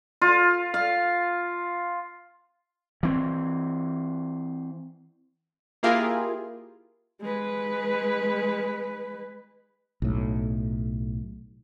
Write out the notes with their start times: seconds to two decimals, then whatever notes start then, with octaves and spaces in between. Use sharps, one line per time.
0.22 F4
0.74 F5
3.03 E3 C4
5.83 A#3 E4 F4 G4 G#4 A#4
7.21 G#3 B4
10.02 B1 A2